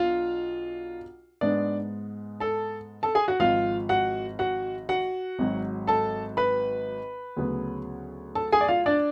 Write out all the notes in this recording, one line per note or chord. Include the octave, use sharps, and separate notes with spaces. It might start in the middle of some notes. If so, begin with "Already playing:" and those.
Already playing: B1 B2 D4 F4 F5
G#2 G#3 B3 D4 D5
A4 A5
A4 A5
G#4 G#5
F#4 F#5
G#1 G#2 F3 F4 F5
F#4 F#5
F#4 F#5
F#4 F#5
G#1 G#2 F#3
A4 A5
B4 B5
D2 C#3 F#3 B3
A4 A5
G#4 G#5
D5
F4 F5
D4 D5